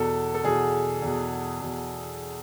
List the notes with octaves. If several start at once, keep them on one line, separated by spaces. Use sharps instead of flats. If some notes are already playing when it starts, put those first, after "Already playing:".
Already playing: E2 B2 A4
A4
E2 B2 G#4
E2 B2
E2 B2